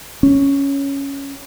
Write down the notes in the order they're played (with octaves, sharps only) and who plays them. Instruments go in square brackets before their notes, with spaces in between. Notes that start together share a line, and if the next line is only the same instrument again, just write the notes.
[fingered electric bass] C#4